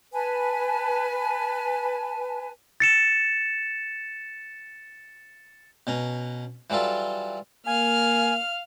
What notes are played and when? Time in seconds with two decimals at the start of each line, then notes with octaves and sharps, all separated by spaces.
0.13 B4 G#5 A5
2.80 A6 C#7 E7
5.87 B2 C#4 A#5
6.70 E3 F#3 G3 F4 A4
7.66 A#3 F5 G#5 F6